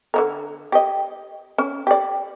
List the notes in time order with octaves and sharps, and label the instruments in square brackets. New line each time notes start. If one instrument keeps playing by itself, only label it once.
[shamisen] D3 F#3 A#4
G4 D#5
C#4
G4 D5